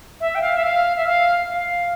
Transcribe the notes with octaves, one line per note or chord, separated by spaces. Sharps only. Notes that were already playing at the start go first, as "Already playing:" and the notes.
E5
G5
F5
E5
F5
E5
F5
F5